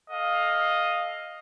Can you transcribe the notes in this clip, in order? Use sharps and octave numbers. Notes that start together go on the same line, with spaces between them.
A4 D#5 F5